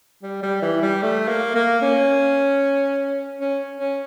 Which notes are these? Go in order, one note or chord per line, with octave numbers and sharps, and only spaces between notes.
G3
G3
E3
G3
A3
A#3
A#3
C#4
C#4
C#4